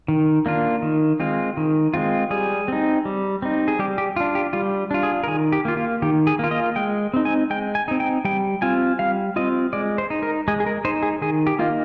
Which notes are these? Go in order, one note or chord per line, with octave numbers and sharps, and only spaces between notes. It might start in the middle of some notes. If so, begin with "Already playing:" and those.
D#3
A#3 D4 F4
D#3
G#3 C4 F4
D#3
G#3 C4 F4
G3 G#4
C4 D#4
G3
C4 D#4
G#4
G3 G4
G4
D4 F4
G4
G3 F4
D4 F4
G#4
A#4
D#3 G#4
G4
A#3 F4
F4
D#3 G4
G#4
A#3 F4
D#5
G#3 G5
C4 D#4
G#5
G#3 G5
G#5
C4 D#4
G5
G3 G5
C4 F4 G#5
G3 F5
C4 F4 D#5
G#3 D5
C5
D#4
A#4
G#3 G#4
G#4
A#4
D#4 C5
G#4
D#3 G#4
G4
A#3 D#4 F4